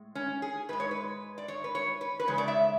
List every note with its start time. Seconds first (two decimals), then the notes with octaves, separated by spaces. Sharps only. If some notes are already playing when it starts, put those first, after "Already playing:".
Already playing: A2 G#3
0.15 C#4
0.42 G#4
0.69 G#2 G#3 B4
0.80 C#5
0.91 B4
1.38 D5
1.48 C#5
1.64 B4
1.75 C#5
2.01 B4
2.20 B4
2.28 E2 C#3 G#3 C#5
2.38 D5
2.48 E5